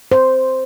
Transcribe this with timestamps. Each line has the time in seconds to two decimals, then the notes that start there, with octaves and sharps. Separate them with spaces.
0.12 C5